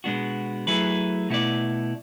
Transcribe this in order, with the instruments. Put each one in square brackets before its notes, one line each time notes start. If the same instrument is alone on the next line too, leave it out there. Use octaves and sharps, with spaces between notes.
[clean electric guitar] B2 G#3 B3 D4 F#4
F#3 A3 E4 G#4 B4
B2 A3 E4 B4 D5